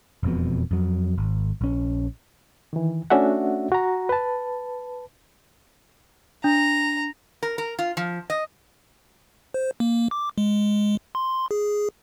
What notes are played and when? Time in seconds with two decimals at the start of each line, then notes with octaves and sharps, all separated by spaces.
0.23 E1 F2 B2
0.71 F2 F#3
1.18 G#1
1.61 A#1 C#4
2.73 D#3 E3
3.10 A3 C#4 D4 F#4 E5 F#5
3.72 F#4 A#5
4.09 B4 A5
6.44 D4 A#5
7.43 A#4
7.58 A#4
7.79 F4
7.97 F3
8.30 D#5
9.54 C5
9.80 A#3
10.11 D6
10.38 G#3
11.15 C6
11.51 G#4